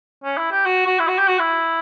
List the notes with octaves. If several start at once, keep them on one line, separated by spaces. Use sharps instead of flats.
C#4
E4
G4
F#4
F#4
E4
F#4
G4
F#4
E4